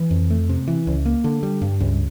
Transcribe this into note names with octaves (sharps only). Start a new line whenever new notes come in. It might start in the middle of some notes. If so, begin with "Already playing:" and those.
Already playing: E3
F2
A3
C3
E3
C#2
A#3
D3
G3
G2
C#2